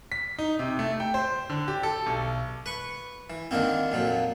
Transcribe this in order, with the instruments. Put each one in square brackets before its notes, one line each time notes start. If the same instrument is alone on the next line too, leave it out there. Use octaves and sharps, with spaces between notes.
[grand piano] B6
D#4
C3
A3
G5
C5
D3
G4
A4
B1
[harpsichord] B4 C#6
E3
D3 D#3 A#3 C4
F2 A#2 F#3